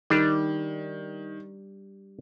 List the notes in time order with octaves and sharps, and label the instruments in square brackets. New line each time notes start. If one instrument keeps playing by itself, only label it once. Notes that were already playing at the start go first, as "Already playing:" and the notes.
[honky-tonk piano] D#3 [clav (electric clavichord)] G3 D4